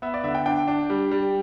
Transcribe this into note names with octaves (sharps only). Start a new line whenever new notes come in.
B3 E5
D5
D3 E5
G5
D4 G5
D4
G3
G3